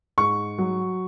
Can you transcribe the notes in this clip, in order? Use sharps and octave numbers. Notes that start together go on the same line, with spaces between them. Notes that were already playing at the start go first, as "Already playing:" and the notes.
G#2 C#6
F#3